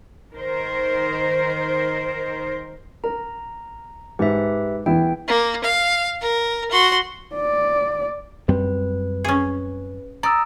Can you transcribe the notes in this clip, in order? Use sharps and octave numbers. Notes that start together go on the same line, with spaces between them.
D#3 A#4 C5
A#4 A#5
G#2 G4 B4 E5
E2 B3 E4 G5
A#3
F5
A#4
F#4 C6
D5
F#2 G3 C4 B4
C#4 G#4
D5 A#5 D#6 E6